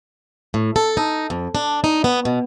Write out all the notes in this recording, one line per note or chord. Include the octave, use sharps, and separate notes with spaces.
A2
A4
D#4
F2
D4
D#4
B3
B2